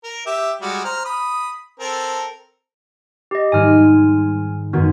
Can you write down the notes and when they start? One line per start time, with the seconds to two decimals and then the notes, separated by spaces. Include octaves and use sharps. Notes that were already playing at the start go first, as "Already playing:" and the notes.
0.04 A#4
0.26 G4 E5
0.62 G3 G#3 F#4
0.85 C5 A#5 F6
1.05 B5 D#6
1.80 C4 A4 A#4
3.31 G4 D#5
3.52 G#2 D#3 G3 G#5 F6
3.77 G#3
4.73 F#2 D#3 G#3 B3 F#4